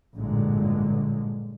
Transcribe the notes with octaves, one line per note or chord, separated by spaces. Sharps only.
A1 G2 A#2 D3 F#3 G#3